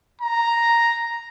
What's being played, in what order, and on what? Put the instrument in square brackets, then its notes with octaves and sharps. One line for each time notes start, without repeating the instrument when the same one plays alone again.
[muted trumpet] A#5